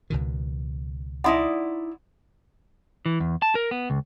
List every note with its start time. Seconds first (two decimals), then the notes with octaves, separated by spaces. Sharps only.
0.10 C#2 B2 D#3
1.24 D#4 E4 D5 F#5 C6 D#6
3.06 E3
3.20 E2
3.42 A5
3.55 A#4
3.71 B3
3.90 C#2